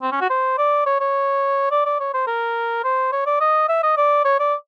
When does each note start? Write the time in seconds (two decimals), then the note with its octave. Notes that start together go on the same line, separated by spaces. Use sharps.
0.02 C4
0.12 C#4
0.21 F#4
0.30 C5
0.58 D5
0.86 C#5
1.01 C#5
1.71 D5
1.86 D5
2.00 C#5
2.14 C5
2.27 A#4
2.84 C5
3.12 C#5
3.26 D5
3.40 D#5
3.69 E5
3.83 D#5
3.97 D5
4.25 C#5
4.40 D5